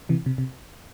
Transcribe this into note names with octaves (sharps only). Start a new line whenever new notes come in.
C3 E3
C3
C3